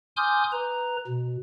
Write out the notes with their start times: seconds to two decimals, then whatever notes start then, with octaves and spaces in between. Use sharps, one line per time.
0.17 G#5 C6 D6 D#6 F6 G6
0.52 B4 A#5
1.08 B2